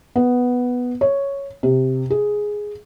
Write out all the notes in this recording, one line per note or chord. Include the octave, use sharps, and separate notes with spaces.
B3
C#5
C3
G#4